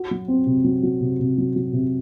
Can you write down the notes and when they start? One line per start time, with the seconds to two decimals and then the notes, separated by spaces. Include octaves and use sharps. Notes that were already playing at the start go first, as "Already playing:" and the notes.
Already playing: F#4
0.11 F#3
0.28 C4
0.47 C3
0.64 F#3
0.83 F#3
1.01 C3
1.20 C3
1.38 F#3
1.56 F#3
1.73 C3